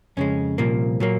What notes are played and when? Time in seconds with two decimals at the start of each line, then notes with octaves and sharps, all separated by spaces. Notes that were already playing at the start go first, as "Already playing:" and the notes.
0.17 F2 C#3 G#3 C#4
0.58 C2 A#2 F3 A#3
1.00 A#2 F#3 A#3